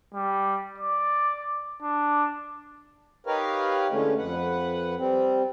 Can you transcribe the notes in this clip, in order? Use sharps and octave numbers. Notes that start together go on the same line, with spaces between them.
G3
D5
D4
D#4 G4 A#4 B4 C#5 F5
D3 E3 G#3 A3 C#4
F2 B4 F#5
G3 C4